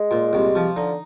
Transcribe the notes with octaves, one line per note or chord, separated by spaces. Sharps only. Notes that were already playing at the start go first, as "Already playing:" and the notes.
Already playing: G#3
A#2
C2
F3
D3 D#4